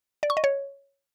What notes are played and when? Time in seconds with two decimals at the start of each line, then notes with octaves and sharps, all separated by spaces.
0.23 D5
0.30 C#6
0.37 D#5
0.44 C#5